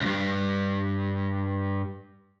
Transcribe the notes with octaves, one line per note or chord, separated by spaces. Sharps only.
C#2 G2